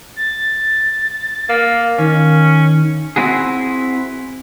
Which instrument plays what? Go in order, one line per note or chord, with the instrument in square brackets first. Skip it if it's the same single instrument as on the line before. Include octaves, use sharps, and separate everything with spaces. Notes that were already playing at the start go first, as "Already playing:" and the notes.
[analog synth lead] A6
[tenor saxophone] A#3
[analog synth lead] D#3 [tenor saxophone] C#4
[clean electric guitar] C4 E4 F#4 G#4